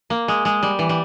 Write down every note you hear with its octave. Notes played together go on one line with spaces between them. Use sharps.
A#3
G#3
G#3
G3
E3
G3